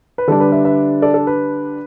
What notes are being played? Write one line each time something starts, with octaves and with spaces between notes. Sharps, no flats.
B4
D3 G3 D4 A4
B4
B4 E5
B4 E5
A4 D5
A4
B4